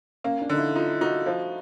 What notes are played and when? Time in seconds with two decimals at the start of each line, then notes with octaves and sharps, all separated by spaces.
0.24 A#3 C#4
0.41 D4
0.49 D3 D#4
0.58 E4
0.76 D#4 F4
1.01 D#4 F#4
1.26 F3